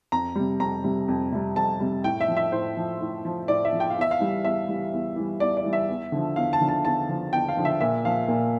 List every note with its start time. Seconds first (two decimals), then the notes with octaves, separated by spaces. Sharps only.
0.12 F2 A#5
0.35 C3 G3
0.60 F2 A#5
0.84 C3 G3
1.08 F2
1.32 C3 G3
1.56 F2 A5
1.80 C3 G3
2.04 A2 G5
2.21 E5
2.28 F3
2.37 E5
2.52 A2 C5
2.77 F3
3.01 A2
3.25 F3
3.48 A2 D5
3.65 E5
3.72 F3
3.80 G5
3.90 F5
3.97 E2 E5
4.11 F5
4.20 E3 G3
4.45 E2 E5
4.68 E3 G3
4.93 E2
5.16 E3 G3
5.40 E2 D5
5.57 D5
5.64 E3 G3
5.73 E5
5.89 E2
6.12 D3 F3
6.36 E2 F5
6.53 A5
6.61 D3 F3
6.69 A5
6.85 E2 A5
7.09 D3 F3
7.33 E2 G5
7.49 F5
7.57 D3 F3
7.65 E5
7.81 A#2 E5
8.05 F3 F5
8.28 A#2